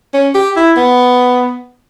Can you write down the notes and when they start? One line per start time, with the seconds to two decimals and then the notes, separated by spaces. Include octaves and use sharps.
0.14 C#4
0.35 G4
0.57 E4
0.77 B3